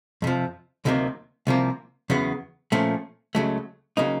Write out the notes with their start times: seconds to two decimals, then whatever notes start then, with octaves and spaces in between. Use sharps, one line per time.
0.22 F2 C3 F3
0.85 D2 C3 D#3 F#3 A#3
1.47 C2 C3 F3 A#3
2.10 E2 C#3 F#3 B3
2.72 A#2 F3 A3 C#4
3.35 C#2 C#3 F#3 A3
3.97 C#3 F#3 A#3 D#4